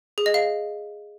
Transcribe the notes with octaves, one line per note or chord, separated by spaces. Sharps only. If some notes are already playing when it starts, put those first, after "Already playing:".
G#4
D#5
F5